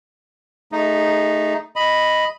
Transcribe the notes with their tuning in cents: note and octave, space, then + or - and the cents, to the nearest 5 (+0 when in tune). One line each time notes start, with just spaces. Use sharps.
A3 +0 D#4 +0 G#4 -30
D#5 +0 B5 +0